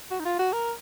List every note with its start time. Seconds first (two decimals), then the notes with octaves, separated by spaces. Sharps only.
0.11 F#4
0.20 D#4
0.25 F4
0.39 F#4
0.53 A#4